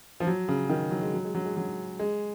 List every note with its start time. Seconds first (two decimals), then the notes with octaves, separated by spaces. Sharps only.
0.20 F3
0.27 F#3
0.48 C#3
0.69 D#3
0.91 F#3
1.02 G#3
1.14 F#3
1.24 G#3
1.35 F#3
1.45 G#3
1.57 F#3
1.99 G#3